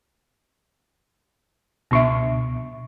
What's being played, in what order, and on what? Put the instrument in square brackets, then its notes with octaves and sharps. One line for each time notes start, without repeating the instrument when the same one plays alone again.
[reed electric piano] C#2 B2 C#6 [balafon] B3 D4 E5